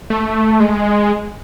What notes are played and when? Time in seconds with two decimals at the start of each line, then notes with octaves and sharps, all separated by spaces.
0.10 A3
0.60 G#3